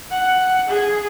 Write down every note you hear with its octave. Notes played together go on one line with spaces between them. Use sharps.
F#5
G#4